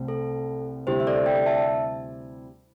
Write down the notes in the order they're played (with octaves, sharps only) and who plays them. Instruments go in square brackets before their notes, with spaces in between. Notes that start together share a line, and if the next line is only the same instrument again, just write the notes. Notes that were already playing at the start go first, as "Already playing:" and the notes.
Already playing: [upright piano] C2 C3 A3 C4
[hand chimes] A4
[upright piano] D2 C3 G3 C4 E4 [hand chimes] G4 C5
[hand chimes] E5
A4 D5
D5 G5
E5 A5